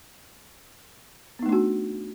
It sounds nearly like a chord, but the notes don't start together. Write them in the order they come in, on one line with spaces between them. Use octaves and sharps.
B3 D#4 A3 D4 F#4